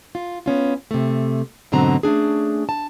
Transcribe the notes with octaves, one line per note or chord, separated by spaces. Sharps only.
F4
B3 C#4 F4
C3 A3
G#2 B2 D3 F#3 C4 A#5
A3 C#4 D4 G#4
A5